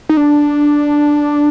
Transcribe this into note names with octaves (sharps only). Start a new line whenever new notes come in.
D#4
D4